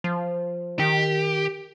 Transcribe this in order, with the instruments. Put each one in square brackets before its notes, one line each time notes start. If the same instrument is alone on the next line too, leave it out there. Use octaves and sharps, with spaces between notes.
[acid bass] F3
[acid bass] D#3 [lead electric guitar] G4